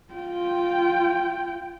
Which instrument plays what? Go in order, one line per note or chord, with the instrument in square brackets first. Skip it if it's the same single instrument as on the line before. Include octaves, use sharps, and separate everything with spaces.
[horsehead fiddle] F4 G5